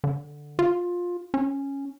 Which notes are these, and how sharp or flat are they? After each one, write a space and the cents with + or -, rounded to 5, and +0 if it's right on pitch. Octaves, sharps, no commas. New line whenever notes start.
D3 +0
F4 +15
C#4 -5